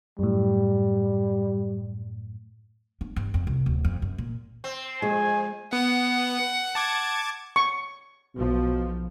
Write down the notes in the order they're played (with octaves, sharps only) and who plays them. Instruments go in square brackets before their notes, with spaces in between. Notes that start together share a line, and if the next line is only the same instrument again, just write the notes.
[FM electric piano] F#2 A2 [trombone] G3
[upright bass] D4
G2
F2
C2
D1
F2
F#2
A#2
[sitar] C4
[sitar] F2 [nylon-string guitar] G#3 G#4 [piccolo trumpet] G#5
[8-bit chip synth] B3 [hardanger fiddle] F#5
[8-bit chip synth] A5 D6 G#6
[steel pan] C#6
[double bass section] B1 F3 [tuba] B2